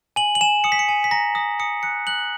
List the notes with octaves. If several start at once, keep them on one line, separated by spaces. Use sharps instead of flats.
G#5 F#7
F#7
G#5 E7
D#6 C#7
B6
C#7
G#5
B6
A#5 A#6
D#6 A#6
D#6 C#7
F#6 C#7
F#6 F#7